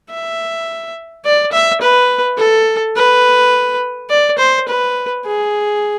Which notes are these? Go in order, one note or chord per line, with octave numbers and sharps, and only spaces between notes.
E5
D5
E5
B4
A4
B4
D5
C5
B4
G#4